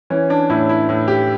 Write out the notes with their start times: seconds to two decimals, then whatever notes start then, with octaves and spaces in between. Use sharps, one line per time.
0.10 E3 C#4
0.30 D4
0.49 A2 E4
0.69 E4
0.89 A2
1.08 G4